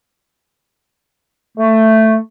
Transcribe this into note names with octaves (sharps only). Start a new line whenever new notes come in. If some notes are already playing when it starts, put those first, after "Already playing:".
A3